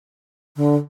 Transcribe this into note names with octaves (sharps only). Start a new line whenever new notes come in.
D3